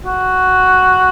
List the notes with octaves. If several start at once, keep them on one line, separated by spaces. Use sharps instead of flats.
F#4